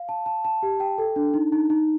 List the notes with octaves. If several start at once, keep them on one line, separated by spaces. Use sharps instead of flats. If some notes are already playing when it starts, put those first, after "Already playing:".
Already playing: F5
A5
A5
A5
G4
G5
A4
D4
D#4
D#4
D#4